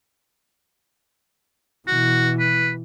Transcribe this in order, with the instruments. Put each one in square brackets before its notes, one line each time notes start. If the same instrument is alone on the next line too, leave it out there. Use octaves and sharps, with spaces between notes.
[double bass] B2 E3 [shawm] F#4
[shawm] B4